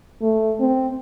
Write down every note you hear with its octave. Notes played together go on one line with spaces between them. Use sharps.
A3
C4